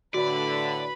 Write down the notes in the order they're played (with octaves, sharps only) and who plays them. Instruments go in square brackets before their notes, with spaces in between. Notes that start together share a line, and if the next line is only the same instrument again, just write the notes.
[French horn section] A2 D3 [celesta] F#4 [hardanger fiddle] B4 B5 [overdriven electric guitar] D5